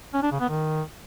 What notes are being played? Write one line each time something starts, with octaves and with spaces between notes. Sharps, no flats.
C#4
D4
C#3
B3
D#3